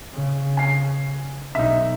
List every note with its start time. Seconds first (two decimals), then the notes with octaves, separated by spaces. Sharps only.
0.13 C#3
0.57 G#5 C7
1.55 B1 D#4 E5